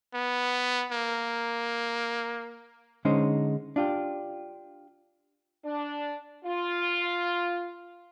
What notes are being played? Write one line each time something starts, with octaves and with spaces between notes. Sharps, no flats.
B3
A#3
D3 G#3 C#4 D#4 C5
D4 F4 G4
D4
F4